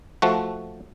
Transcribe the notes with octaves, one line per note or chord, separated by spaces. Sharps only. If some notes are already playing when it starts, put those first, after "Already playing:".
F3 A3 F#4